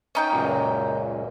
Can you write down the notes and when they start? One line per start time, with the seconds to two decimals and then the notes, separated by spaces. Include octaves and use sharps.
0.15 C#4 D#4 G5
0.32 C#2 F#2 A#2